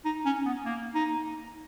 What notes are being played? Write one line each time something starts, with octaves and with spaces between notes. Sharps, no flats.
D#4
C#4
B3
A#3
D#4